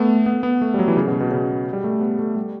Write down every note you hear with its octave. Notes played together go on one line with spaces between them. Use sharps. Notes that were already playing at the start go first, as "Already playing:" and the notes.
Already playing: A3 B3
B3
B3
A3
G3
F#3
E3
C#3
B2
B2
C#3
G3
A3
B3
A3
G3